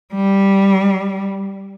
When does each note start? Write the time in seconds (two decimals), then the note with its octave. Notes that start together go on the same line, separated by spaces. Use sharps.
0.14 G3